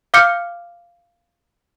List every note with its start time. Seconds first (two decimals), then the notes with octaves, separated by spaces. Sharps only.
0.14 F5 D6 F6 G6 C#7